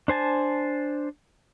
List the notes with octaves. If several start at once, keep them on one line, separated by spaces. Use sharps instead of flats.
D4 C5 G#5 A5